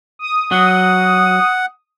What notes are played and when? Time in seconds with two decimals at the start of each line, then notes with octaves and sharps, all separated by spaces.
0.19 D#6
0.51 F#3 F#5